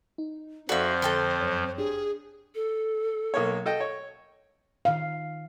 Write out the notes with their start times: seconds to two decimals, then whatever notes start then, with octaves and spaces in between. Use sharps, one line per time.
0.18 D#4
0.69 F2 F3 F#4 A4 C5 D5 E5 F5
1.02 D3 A4 G5 C6
1.40 F#2 C#5
1.77 G1 D4 G4 G#4
2.55 A4
3.34 B1 A#3 C#5
3.66 A4 D#5 G5
3.80 C#5
4.85 D#3 F5